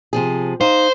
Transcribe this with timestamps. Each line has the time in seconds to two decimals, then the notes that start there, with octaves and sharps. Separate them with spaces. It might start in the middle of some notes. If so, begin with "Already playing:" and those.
0.13 C3 F3 G#4
0.61 D#4 C5 F5